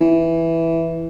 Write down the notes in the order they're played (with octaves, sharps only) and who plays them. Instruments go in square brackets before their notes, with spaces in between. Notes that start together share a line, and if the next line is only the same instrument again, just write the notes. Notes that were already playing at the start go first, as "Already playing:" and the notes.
[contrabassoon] E3